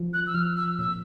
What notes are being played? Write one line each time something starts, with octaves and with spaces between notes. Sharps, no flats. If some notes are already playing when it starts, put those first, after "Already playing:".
Already playing: F3
F#6
E6
F3 F6
E6
A#2 E6